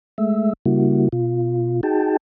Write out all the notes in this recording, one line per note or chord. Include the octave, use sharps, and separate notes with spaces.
G#3 A3 E5
C#3 G3 A#3 E4 F#4
B2 F4
D#4 F#4 G#4 G5 A5